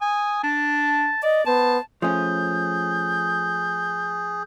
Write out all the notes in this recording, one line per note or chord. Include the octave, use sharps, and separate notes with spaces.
G#5 D#6
D4 A5
D5 D#5
B3 C5 A5
F3 A3 C#4 G#4 G6